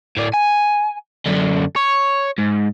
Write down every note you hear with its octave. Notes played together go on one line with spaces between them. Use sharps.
A2 D5
G#5
F#2 D3
C#5
G#2